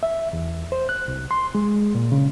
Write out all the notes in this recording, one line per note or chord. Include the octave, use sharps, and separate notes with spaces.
E5
E2
C5
F#6
C2
C6
G#3
A#2
C#3